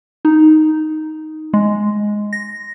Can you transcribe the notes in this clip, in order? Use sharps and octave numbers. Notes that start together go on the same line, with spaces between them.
D#4
G#3
A#6